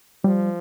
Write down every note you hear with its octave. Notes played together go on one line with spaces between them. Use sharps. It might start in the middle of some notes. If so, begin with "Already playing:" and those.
F3 G3